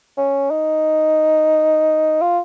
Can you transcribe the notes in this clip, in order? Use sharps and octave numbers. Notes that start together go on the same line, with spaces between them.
C#4
D#4
F4